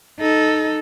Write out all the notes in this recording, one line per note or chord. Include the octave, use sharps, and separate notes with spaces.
D#4 A4